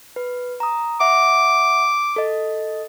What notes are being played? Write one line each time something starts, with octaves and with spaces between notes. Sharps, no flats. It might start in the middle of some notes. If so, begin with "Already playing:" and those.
B4
A#5 D#6
E5 F#5 D6
A4 D#5